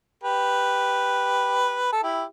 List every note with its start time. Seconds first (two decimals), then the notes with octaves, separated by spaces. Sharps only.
0.23 G4 B4
1.93 A4
2.03 E4 G4